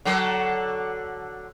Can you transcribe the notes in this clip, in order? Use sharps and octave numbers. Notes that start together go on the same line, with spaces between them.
D3 F#3 A4